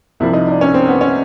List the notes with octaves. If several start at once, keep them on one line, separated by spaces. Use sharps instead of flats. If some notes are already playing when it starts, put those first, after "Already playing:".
C2 C3 F3 E4
D#4
D4
C#4
C4
B3
C#4